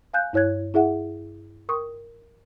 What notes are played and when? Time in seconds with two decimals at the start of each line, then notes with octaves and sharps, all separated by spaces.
0.14 F5 G#5 F#6 G6
0.33 G2 E4 C#5 F#6 G#6
0.74 E4 G#4 E5 F#5
1.69 A#4 G5 C6 C#6 D#6